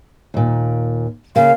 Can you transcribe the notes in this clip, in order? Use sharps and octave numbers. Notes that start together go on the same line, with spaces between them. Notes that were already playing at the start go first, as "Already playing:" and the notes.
D#2 A#2
C#3 A#3 F5